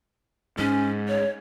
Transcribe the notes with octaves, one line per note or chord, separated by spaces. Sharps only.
G#2 C#4
C#5